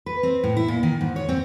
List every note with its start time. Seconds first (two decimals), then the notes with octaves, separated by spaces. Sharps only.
0.06 B4
0.23 C4
0.44 A2
0.57 E4
0.68 A#2
0.83 D#3
1.01 G#2
1.16 C#5
1.29 C4